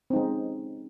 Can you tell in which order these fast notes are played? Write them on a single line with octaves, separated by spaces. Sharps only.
C4 D#4 G#3 C#4